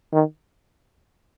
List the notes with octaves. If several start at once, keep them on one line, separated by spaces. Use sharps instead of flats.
D#3